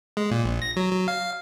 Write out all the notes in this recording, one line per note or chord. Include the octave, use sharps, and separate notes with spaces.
G#3
A#2
A#1
A#6
F#3
F#3
F5